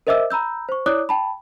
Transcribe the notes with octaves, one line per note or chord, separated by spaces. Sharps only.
A#4 C5 D#5 E5 D6 E6
A#5 B5 E6 G6
C5 C#6
E4 C#5 D5 D6 D#6 F#6
G5 A5 B5